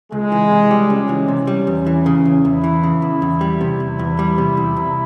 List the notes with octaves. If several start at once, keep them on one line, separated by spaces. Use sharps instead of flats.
C#2 G#3
E3
C3
G3
C#2 C#4
E3
C3
G3
E2
E3
C#3
E2
E2 E4
E3
C#3
E2
E2
G3
C3
E2
E2
G3
C3
E2
C2